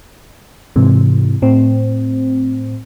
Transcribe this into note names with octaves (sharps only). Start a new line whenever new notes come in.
G#2 C3 E3
A2 C4